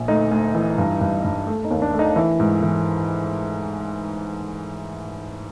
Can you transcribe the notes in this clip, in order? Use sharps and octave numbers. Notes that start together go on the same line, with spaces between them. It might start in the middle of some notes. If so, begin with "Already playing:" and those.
Already playing: A#1
D2 D#4
D2
E3
G2
G2
G2
A3
D#4
D#2
D4
A3
D#4
E3 E4
G#2
E3